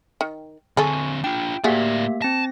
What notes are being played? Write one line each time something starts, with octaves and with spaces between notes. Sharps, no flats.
D#3
D3 C4 G#4 A4 G#5 C#6
D4 F4 G5
A2 F#3 A#3 G4 G#4 D5 E5 F5
C4 A5 A#6